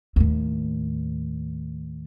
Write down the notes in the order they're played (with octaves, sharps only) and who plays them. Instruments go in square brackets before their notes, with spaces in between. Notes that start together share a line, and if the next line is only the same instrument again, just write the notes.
[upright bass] D#2 A2